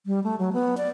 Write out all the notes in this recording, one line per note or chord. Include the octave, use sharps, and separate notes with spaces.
G3
A3
F#3
B3
D5